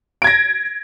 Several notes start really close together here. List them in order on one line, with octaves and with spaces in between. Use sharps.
D7 G#6 A#6